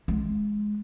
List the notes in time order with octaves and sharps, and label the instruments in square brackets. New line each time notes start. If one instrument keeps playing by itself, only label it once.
[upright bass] G#3